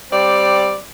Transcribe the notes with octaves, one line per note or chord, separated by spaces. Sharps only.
G3 C4 D5